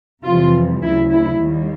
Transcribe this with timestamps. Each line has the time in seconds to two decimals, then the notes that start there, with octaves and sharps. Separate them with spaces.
0.23 F2 C3 E3 G3 F4
0.81 D2 C#3 F#3 E4
1.11 E4
1.40 D#2 D#3 G3 A#3